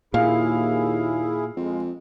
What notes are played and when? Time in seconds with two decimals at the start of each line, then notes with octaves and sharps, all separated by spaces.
0.14 D#2 A#2 E4 G#4 F5
1.57 F2 G#3